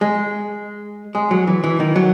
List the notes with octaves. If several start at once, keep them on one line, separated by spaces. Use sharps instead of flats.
G#3
G#3
F#3
E3
E3
D#3
F#3